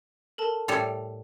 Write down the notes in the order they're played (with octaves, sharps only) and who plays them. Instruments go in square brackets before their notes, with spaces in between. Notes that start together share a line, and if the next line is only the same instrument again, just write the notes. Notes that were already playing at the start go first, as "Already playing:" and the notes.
[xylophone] A4 A#4 A5
[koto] A2 G3 A4 [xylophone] F7